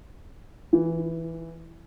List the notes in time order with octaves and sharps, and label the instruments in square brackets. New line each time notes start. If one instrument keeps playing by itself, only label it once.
[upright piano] E3